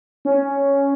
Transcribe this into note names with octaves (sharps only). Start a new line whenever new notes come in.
C#4